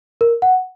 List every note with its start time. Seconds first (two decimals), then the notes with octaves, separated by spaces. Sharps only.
0.21 A#4
0.42 F#5